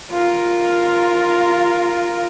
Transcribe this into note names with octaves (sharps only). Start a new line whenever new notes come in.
F4 A#4